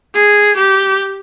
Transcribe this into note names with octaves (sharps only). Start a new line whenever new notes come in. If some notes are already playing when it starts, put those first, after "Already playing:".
G#4
G4